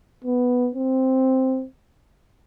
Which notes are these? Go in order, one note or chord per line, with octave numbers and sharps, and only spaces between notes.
B3
C4